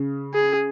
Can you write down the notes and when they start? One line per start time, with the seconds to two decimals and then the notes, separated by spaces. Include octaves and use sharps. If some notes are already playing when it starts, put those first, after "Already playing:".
Already playing: C#3
0.34 G#4